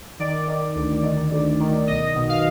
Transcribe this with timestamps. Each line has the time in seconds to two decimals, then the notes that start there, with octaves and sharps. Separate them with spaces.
0.19 D#3 D5
0.48 D#3
0.75 D2
1.03 D#3
1.31 D2
1.60 D#3
1.87 B1 D#5
2.15 B2
2.29 F5